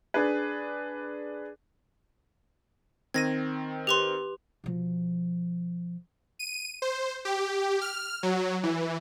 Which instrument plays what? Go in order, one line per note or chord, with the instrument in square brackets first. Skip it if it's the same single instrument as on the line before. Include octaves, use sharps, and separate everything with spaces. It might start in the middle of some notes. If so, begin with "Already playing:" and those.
[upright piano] D4 G#4 B4
[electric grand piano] D#3 C4 [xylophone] G#6 A#6 D#7
[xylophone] G4 B4 C6
[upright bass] B2 F3
[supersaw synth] D#7
C5
G4
F6
F#3
E3